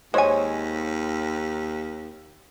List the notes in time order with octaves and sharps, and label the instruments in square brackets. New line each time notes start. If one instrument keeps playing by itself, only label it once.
[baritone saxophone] D#2 [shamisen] G#3 G#5 [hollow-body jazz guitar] C5 C#5